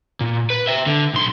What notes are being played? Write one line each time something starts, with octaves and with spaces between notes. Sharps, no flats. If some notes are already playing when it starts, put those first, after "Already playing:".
A#2
B4
C5 E5
D3
B1 C6